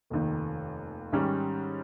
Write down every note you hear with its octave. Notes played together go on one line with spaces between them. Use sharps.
F1 D#2 D#3
G#2 D#3 G3 C#4